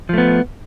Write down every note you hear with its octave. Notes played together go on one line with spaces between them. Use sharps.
F3 A3 B3